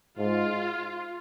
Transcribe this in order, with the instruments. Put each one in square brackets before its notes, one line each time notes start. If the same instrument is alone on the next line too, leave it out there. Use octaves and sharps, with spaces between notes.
[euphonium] G#2 [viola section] F4